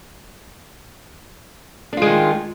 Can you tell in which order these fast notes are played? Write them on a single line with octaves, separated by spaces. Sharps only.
D4 F4 G#3 D#3